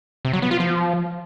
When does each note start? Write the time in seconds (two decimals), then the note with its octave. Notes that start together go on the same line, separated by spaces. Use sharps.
0.25 C3
0.33 F#3
0.42 B3
0.51 F4
0.60 F3